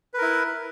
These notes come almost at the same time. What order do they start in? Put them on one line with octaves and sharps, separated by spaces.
B4 A#4 E4